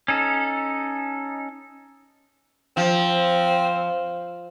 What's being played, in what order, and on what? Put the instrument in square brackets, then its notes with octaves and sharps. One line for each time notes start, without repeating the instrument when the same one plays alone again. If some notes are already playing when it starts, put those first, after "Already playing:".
[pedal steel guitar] C#4 D#4 A4
[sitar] F3 [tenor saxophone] C4